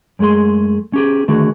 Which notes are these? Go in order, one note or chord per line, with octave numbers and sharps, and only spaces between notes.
F#2 G#3 A3 G#4 C6
C#4 G4 G#4
D3 D#3 A3 F#4 G#4